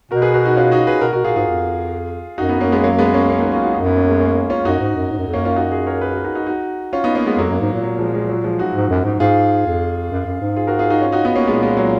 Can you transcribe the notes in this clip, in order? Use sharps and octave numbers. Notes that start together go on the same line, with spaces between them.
B2 F#4 A#4
G#4 B4
F#4 A#4
D#4 F#4
C#4 F4
D#4 F#4
G#4 B4
B2 F#4 A#4
B2 F#4 A#4
A#2 F4 G#4
G#2 F4 G#4
F2
F#2 D#4 F#4
B3 D#4
F#2 A#3 C#4
G#3 B3
F#3 A#3
G#3 B3
A#3 C#4
A#3 C#4
B3 D#4
C#4 F4
D#4 F#4
F#2 D#4 F#4
B3 D#4
A#3 C#4
G#3 B3
A#3 C#4
C#4 F4
F#2 D#4 F#4
G#2
F#2
G#2
F#2
F2
F#2 A#3 C#4
C#4 F4
D#4 F#4
F4 G#4
A#4 C#5
G#4 B4
F#4 A#4
D#4 F#4
D#4 F#4
D#4 F#4
C#4 F4
B3 D#4
A#3 C#4
G#3 B3
F2 F#3 A#3
F#2
G#2
A#2
F#3 A#3
F3 G#3
F3 G#3
F#3
F3 G#3
D#4 F#4
G#2
F#2
G#2
G#2 F4 G#4
F2
F#2
F#2
G#2
F4 G#4
F#4 A#4
F4 G#4
D#4 F#4
C#4 F4
D#4 F#4
B3 D#4
A#3 C#4
A#2 G#3 B3
G#3 B3
F#3 A#3